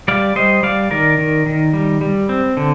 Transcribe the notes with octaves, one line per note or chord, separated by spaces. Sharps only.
G3 D5 F5
G3 C5 D#5
G3 D5 F5
D#3 A#4 D5
D#3
D#3
G3
G3
C4
D3